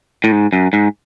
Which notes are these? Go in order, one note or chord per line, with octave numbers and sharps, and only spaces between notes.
A2
G#2
F#2
G#2